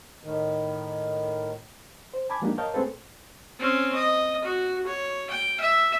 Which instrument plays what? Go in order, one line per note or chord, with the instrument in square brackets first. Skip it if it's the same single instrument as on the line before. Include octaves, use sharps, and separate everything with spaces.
[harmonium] A2 D#3
[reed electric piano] C5
G#5 A5 B5 D6 G#6
F3 G#3 A#3 D4 D#4 G4
A#4 C#5 D#5 F5 A5 G6
A3 C4 G#4 A4 B4
[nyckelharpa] C4 C#4
D#5
F#4
C#5
G5
E5